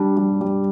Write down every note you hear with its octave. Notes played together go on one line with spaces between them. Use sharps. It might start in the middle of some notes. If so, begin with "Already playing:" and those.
Already playing: G3 D4
G3
G3